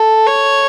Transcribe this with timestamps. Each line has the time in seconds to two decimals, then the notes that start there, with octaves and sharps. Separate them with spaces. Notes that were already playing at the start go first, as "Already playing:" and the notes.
Already playing: A4
0.27 C#5